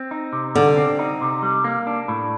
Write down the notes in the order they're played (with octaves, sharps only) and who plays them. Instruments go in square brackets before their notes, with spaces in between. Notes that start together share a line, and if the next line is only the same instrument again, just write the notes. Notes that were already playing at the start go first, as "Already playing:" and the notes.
Already playing: [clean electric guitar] C4
D#4
C3
[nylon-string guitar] D3 [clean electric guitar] G3
[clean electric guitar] C4
D#4
C3
G3
A#3
D4
A2